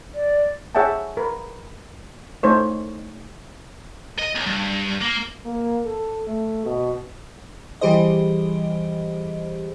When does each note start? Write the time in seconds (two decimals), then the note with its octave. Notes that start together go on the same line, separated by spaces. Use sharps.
0.15 D5
0.75 G#4 C#5 E5 F#5 G5 A5
1.17 A#4 B4
2.43 A3 D#4 C5 C#5
4.19 D#5
4.35 B1
4.47 G2
5.01 A#3
5.45 A#3
5.85 A4
6.27 A3
6.66 B2
7.81 E3 G3 G4 G#4 C5 D#5